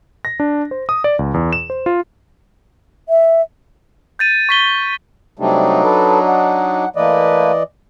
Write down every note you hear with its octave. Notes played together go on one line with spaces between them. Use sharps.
A#6
D4
C5
D#6
D5
C#2
E2
E7
C5
F4
E5
G6 A6 D#7
C#6 B6 G7
C3 F#3 G3 A3 D4 D#4
A4 B4
F#5
E3 A3 A#3 B4 D5 D#5